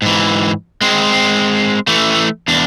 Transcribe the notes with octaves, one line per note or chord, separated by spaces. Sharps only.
G#2 E3
G#3 C4
E3 A3
E2 D4